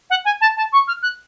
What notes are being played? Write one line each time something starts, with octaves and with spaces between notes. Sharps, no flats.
F#5
G#5
A5
A5
C#6
F6
F#6